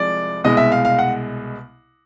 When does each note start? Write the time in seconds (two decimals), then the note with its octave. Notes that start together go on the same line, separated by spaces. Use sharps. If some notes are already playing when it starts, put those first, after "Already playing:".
Already playing: C2 C3 F3 G#3 D5
0.44 C2 B2 G#3 D#5
0.57 E5
0.72 F5
0.85 F5
0.99 F#5